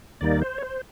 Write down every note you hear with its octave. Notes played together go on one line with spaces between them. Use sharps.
D#2 D#3 G3 A#3 D#4 D5
C5
C#5
C5